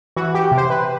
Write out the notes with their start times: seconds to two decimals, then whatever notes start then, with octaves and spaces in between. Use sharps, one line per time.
0.16 E3 F#4
0.35 G4
0.51 C3
0.58 C5
0.70 B4